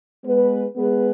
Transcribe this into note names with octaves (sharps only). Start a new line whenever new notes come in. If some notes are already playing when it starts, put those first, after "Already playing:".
G#3 B3 G#4 B4
G#3 B3 G#4 B4